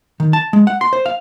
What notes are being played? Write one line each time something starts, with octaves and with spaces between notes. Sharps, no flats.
D#3
A5
G#3
F#5
C6
C5
F5